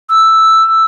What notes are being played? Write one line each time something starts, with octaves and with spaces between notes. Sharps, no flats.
E6